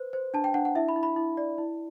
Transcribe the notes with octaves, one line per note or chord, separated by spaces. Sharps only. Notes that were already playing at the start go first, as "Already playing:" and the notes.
Already playing: B4 C5
C5
D4 A5
G5
D4 F#5
F#5
E4 E5
B5
E4
B5
E4
D5
E4